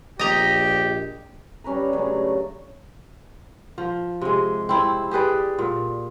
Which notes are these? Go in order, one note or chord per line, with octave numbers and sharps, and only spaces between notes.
A#1 G4 D#5 A#5
G3 C#4 B4 A#5
C#3 F#3 A3 D4
F3
C3 G#3
C4 E4
G4 G#4 B4 D5
A#2